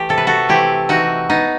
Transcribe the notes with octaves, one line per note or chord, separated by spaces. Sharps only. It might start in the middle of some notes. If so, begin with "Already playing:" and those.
Already playing: E3 A3 G4
C3 A4
B4
F#4 A4
E3 A3 C4 E4 G4
E3 D#4 F#4
B3 D#4